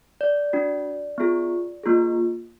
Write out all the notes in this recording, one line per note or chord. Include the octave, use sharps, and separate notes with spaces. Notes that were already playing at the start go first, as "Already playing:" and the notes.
D5
D4 F#4
B3 F4 G#4
A#3 F4 G#4